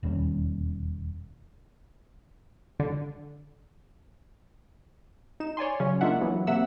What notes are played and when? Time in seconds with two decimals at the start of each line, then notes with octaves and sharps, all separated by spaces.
0.03 E1 D#2 G3 C#4
2.80 D3
5.40 D#4 E7
5.57 C#5 D5 G#5 C6
5.80 C#3 F#3 C#4
6.01 G#3 A#3 D4 F4 E5 F#5
6.21 E3 F#3 B3
6.47 C3 A#3 E5 F#5 E6